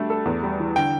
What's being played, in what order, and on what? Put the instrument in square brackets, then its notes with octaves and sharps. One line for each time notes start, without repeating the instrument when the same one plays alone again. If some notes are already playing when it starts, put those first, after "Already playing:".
Already playing: [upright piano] G3 A3 D4
A4
E2
G3
E3
[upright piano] D3 [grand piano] G5